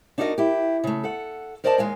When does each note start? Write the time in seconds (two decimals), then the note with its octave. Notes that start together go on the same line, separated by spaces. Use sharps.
0.18 D4 D#4 F#4 A#4 D5 D#5
0.38 E4 G4
0.84 C#3 A3
1.04 A4 F#5
1.64 A#4 C5 D5 D#5 G#5 A5
1.78 D#2 G#3 F5 G#5